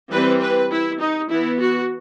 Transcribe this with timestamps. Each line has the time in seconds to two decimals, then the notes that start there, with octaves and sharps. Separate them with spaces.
0.10 E3 G3 C4 B4
0.41 B4
0.70 E4
1.00 D#4
1.30 E3 B3 E4
1.59 F#4